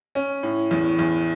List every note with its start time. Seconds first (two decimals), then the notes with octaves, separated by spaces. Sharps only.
0.15 C#4
0.43 A2
0.71 E2
0.99 E2